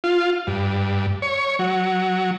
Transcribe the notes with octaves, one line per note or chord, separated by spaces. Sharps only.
F4
G2
C#5
F#3